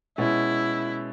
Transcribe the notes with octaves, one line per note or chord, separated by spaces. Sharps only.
B2 G#3 C#4 E4